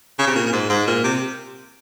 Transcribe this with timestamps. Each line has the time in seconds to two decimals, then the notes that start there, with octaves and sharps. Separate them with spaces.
0.19 C#3
0.27 C3
0.35 A#2
0.46 A#2
0.53 G#2
0.69 G#2
0.87 A#2
1.04 C3